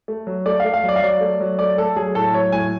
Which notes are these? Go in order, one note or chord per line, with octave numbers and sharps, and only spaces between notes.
A3
F#3
A3 D5
A3 F5
F5
F#3
D5
F5
F#3 D5
A3
F#3
A3 D5
A3 A4
F#3 G#4
A2 A4
F#3 C#5
A2 G#5